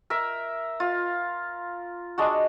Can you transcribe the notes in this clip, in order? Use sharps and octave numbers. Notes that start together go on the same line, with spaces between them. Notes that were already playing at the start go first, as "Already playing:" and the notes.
A#4 E5
F4
G#3 D4 F#4